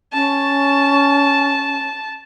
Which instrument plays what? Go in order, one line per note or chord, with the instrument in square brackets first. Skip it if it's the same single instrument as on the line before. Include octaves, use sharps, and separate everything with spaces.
[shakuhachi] C#4 [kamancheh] A5